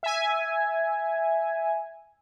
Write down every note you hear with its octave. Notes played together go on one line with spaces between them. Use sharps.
E5 G#5